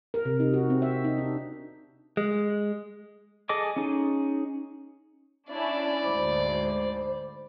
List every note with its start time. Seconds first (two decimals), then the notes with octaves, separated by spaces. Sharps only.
0.14 A#4
0.25 C3
0.40 D#4
0.53 F#4
0.70 C4
0.82 E5
1.04 D#4
1.18 D4
2.17 G#3
3.49 G#4 A4 D#5 G#5 D6
3.76 C#4 D#4 G#4
5.51 C#4 D4 E4 D5
6.04 D2 G#2 C5 B5 D6